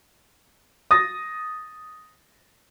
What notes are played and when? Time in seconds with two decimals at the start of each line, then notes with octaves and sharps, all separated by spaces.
0.91 D#6 A6 A#6